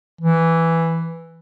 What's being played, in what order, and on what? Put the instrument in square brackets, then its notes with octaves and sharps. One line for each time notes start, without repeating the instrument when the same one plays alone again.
[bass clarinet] E3